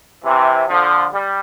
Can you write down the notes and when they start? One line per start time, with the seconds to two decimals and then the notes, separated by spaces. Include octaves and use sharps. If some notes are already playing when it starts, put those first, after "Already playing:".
0.24 C3 E3
0.68 D3 F3
1.12 G3